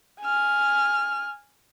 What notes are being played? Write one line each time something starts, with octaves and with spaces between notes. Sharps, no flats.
G#5 F6